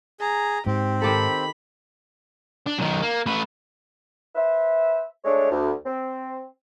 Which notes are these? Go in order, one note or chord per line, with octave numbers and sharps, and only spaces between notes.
G#4 A#5
G#2 C4 G4
D#3 G4 A4 B5
D4
B1 D#3
A#3
A3 B4
B4 C5 E5
G#3 A3 D4 C#5
D2
C4